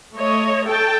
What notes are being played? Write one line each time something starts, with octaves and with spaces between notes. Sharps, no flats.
A3 C#5 D#5
A4 G5 A5